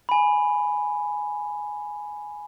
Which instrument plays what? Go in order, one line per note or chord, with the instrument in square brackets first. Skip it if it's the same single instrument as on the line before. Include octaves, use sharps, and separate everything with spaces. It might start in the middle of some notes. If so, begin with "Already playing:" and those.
[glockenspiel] G#5 B5